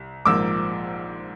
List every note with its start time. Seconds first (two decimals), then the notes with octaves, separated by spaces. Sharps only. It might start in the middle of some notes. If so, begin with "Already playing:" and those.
Already playing: C2
0.25 A#1 G#2 F3 A#3 D6 E6